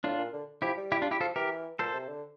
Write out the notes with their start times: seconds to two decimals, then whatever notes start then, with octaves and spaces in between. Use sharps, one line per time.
0.04 A2 D4 F4
0.18 A#2
0.33 D3
0.62 F3 E4 G4
0.77 G3
0.92 E4 G4
1.02 D4 F4
1.11 E4 G4
1.21 F3 F4 A4
1.36 E3 G4 A#4
1.79 A#2 A4 C5
1.94 C3
2.08 D3